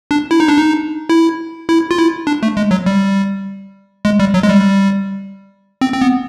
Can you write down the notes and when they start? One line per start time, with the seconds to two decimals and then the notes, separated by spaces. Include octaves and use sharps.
0.11 D4
0.31 E4
0.40 D#4
0.48 D4
0.57 D#4
1.09 E4
1.69 E4
1.91 F4
1.98 E4
2.27 D4
2.43 A3
2.57 G#3
2.71 F#3
2.86 G3
4.05 G#3
4.19 G3
4.34 F#3
4.43 G#3
4.48 G3
5.81 C4
5.94 C4
6.01 B3